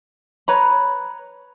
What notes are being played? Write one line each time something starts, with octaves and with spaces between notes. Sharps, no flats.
B4 C#5 A#5 B5